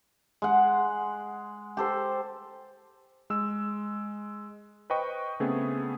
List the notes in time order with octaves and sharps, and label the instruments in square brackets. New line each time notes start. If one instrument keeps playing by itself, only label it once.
[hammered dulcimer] G#3 F#5
G4 A4 C5
[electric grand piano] G#3 E6
B4 C5 D#5 G5 C#6
C#3 A3 B3 C4 G#4